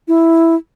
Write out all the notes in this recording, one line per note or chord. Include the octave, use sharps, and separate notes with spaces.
E4